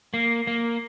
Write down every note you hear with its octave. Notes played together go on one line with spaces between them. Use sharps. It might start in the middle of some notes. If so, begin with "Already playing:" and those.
A#3
A#3